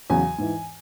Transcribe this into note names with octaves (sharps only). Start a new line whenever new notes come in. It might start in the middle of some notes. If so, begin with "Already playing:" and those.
E2 C#3 F#3 G#5
G#2 E3